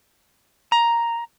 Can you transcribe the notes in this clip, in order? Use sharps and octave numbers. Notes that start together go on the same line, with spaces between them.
A#5